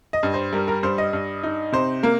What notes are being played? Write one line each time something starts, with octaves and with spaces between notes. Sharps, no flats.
D#5
G2
C5
G3 A#4
A#4
G2 C5
D#5
G2
D#4
C3 C5
A#3 A#4